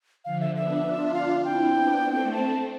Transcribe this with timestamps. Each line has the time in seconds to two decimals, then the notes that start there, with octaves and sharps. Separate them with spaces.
0.25 D3 F3 F5
0.40 E5
0.55 B3 D4 E5
0.84 D4 F4
1.14 F5
1.44 C4 E4 G5
1.74 B3 D4
2.04 A3 C4
2.33 A5